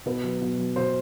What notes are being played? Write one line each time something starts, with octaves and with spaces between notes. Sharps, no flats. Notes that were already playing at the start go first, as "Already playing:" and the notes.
B2 B4
F#3
B2
F#3
B2 C5